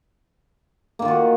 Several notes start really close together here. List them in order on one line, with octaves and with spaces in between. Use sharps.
A#3 D#3 F4 F#4